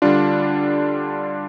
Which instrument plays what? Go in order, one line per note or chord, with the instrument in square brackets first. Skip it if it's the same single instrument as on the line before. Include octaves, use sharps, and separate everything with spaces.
[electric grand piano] D3 G3 D4 F4